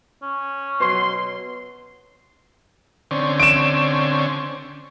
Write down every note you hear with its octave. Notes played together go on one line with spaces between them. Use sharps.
C#4
B2 F#3 C6
D3 C4 C#4
D7 E7